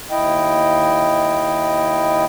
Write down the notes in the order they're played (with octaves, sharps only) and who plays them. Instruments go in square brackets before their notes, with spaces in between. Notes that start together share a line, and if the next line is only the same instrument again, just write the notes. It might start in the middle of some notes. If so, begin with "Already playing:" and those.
[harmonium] D#2 E4 D#5 G5